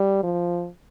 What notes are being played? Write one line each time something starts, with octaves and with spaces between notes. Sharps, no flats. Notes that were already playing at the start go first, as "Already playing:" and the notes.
Already playing: G3
F3